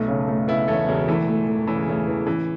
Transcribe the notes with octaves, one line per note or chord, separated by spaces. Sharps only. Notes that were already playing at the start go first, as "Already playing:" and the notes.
Already playing: B1 A3
C#3
A3
C#3 B3 E4
E1 A3 C#4
E1 C#3 F#3
E2 E3 A3
A3
A3
E3 C#4
C#3
C#3 A3
E2
A1 E3